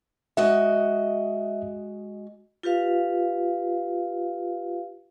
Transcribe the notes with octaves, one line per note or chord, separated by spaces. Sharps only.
G#3 F#4 D#5 E5
F4 G4 B4 F5